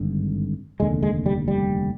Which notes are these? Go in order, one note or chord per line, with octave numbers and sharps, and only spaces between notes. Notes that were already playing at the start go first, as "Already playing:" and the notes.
Already playing: G#1 G2 D3
F1 D#2 D3 G#3
G#3
G3
G3